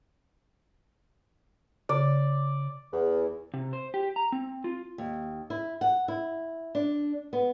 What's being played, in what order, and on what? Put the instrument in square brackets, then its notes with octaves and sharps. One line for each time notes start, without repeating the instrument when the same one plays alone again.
[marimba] C#3 [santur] D5
[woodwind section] E2
[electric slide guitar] C3
C5
G4
A#5
C4
F4
[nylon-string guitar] D#2
E4
F#5
E4
D4
B3